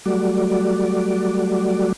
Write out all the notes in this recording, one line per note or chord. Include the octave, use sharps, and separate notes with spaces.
F#3 G3 A3 F#4 D5